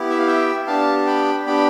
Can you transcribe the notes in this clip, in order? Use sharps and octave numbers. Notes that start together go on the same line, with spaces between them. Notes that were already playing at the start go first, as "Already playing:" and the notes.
Already playing: B3 E4 G4
E5
F5
E5 G5
B3 D4 G4 F5 A5
G5 B5
B3 D4 G4 G5 B5